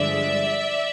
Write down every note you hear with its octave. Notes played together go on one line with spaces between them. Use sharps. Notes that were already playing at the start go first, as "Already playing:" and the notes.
Already playing: G2 D3 F3 G#3 D5 E5